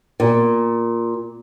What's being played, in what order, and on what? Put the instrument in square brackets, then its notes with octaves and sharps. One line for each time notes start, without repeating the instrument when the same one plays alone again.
[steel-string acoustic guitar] A#2